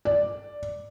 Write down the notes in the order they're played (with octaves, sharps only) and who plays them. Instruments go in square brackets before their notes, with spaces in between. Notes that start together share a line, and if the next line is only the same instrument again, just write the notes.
[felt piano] D5